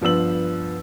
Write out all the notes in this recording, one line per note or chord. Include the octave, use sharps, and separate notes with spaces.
G2 F3 B3 E6 F#7